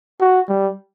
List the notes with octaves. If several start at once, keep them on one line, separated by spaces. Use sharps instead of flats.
F#4
G3